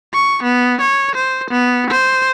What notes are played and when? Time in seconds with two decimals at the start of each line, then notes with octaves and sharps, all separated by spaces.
0.14 C#6
0.43 B3
0.81 C#5
1.15 C5
1.50 B3
1.90 C5